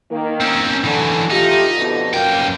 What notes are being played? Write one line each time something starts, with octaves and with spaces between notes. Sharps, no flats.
D#3 A#3
C4 C#4
D3 E3 F#3
A3 D#4 F4 G4
F2 B2 D3
F#2 A#3 G5